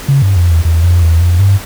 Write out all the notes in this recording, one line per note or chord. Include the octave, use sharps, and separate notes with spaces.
C#3
G2
F2
E2
E2
F2
E2
F2
G2